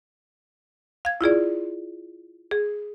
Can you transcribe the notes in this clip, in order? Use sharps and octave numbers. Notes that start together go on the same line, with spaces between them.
F5 G#6
E4 F4 G#4 D5
G#4